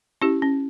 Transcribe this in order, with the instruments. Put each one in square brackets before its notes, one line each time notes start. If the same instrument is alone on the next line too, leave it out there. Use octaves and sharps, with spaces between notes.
[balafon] C#4 E4 G4
C#4